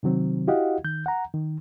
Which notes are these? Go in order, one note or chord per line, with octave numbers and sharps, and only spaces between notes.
C3 D#3 F#3 C4
E4 F#4 G4 D#5 F5 F#5
D#3 G6
F#5 A#5
D#3